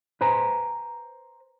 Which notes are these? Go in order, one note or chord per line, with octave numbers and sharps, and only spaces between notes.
B4 C5 G#5 A#5